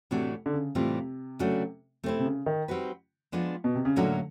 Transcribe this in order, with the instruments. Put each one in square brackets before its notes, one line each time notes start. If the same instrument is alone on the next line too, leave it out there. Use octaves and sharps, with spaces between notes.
[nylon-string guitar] A2 E3 A3 D4 F#4 [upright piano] C3
[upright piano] D3
C#3
[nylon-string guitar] A2 E3 G3 C4 F4 [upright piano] C3
[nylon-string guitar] C#3 F#3 A3 D4 F#4
[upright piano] C3 [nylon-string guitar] A3 C4 E4
[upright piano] C3
C#3
D#3
[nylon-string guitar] G3 C4 D#4 F#4 B4
F3 G#3 B3 D4 F4
[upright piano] B2
C3
C#3
[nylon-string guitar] A2 F#3 A#3 C#4 F#4 [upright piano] D3